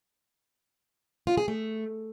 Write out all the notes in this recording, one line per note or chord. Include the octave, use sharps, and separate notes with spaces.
F4
G#4
A3